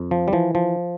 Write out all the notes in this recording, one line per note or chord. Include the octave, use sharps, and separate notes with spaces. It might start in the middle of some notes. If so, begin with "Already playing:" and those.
Already playing: F2
F3
G3
E3 F3
F3